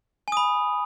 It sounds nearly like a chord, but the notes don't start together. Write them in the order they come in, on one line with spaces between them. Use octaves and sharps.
G#5 D#6 B5